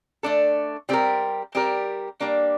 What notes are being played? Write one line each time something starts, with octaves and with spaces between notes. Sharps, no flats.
A3 D4 A4
G3 C4 G4 A#4
G3 C4 G4 A#4
G3 A#3 D4